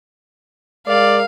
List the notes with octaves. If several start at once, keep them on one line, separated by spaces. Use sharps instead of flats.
G#3 A#4 D5 F5